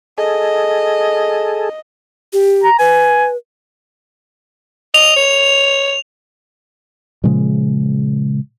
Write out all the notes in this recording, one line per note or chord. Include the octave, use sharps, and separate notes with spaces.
G#4 A4 D#5
G4
A#5
B4 G#5
D#5 F7
C#5
A#2 C#3 F3 G#3